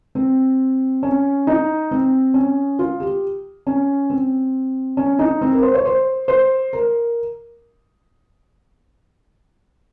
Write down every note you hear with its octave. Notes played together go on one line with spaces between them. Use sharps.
C4
C#4
D#4
C4
C#4
F4
G4
C#4
C4
C#4
D#4
C4
A#4
C5
C#5
C5
C5
A#4